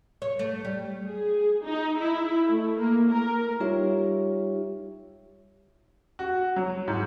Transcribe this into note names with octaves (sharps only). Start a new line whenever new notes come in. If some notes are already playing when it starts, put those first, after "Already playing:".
C#5
A3
G3
G#4
D#4
E4
A3
A#3
A#4
G3 D#4 F4 G4 C#5 E5
F#4
F#3
G#2